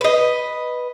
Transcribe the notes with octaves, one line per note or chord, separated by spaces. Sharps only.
B4 D#5